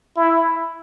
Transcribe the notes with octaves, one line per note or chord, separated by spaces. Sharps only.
E4